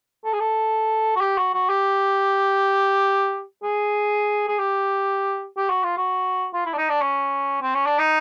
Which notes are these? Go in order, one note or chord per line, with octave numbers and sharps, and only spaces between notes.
A4
G#4
A4
F#4
G4
F#4
F#4
G4
G#4
G#4
G4
G4
F#4
F4
F#4
F4
E4
D4
D#4
D4
C#4
C4
C#4
D4
D#4